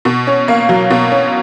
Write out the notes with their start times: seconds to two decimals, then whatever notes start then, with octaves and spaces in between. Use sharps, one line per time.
0.05 B2
0.27 C#4
0.48 A#3
0.69 F#3
0.90 B2
1.12 C#4